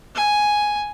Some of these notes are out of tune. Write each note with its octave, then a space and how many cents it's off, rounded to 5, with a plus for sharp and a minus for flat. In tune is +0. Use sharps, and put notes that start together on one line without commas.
G#5 +0